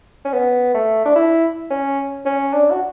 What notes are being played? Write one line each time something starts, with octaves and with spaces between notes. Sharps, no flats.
C#4
B3
A3
D4
E4
C#4
C#4
D4
F#4